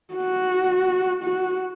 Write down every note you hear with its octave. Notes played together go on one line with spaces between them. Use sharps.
F#4
F#4